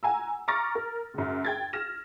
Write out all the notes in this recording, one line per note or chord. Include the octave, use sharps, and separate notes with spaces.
F#5 G#5 A#5 E6
A#5 C#6 D6 F6 A6 A#6
A#4
C#2 F#2
G5 G#6 A6
F6 A#6 E7